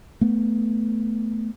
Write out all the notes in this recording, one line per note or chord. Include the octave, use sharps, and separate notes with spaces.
A3 B3